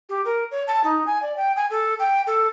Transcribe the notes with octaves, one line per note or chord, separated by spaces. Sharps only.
G4
A#4
C#5
A5
D#4
G#5
D5
G5
G#5
A4
G5
A4